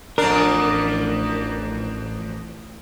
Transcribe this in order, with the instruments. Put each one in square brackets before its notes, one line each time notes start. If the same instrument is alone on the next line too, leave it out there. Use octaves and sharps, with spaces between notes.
[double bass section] A1 [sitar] F2 D4 [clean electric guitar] A#4